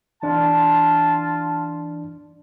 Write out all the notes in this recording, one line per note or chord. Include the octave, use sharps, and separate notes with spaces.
E3 D4 F4 A5